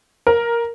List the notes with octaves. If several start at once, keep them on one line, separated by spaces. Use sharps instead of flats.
A#4